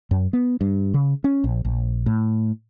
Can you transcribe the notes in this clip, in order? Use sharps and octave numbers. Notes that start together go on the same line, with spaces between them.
F#2
B3
G2
C#3
C#4
A#1
A#1
A2